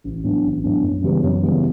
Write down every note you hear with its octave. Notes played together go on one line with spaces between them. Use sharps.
A1
A2 F#3 B3 D4
A1
A2 F#3 B3 D4
F#2
C#3 E3 G3 B3
F#2
C#3 E3 G3 B3